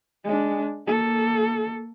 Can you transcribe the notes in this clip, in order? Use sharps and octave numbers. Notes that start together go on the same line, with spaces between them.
G#3 D4
A#3 A4